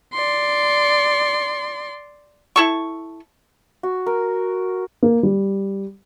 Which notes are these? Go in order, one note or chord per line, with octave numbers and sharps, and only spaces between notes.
D5 C6
E4 A4 C#6
F#4
A#4
A#3
G3